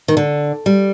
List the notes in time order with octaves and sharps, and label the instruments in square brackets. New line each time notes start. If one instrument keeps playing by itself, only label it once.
[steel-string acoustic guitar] D#3
D3
G3